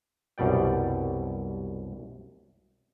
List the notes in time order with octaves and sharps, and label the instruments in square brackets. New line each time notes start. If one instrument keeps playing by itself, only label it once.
[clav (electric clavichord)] C2 F#2 B2 G3 D5 G5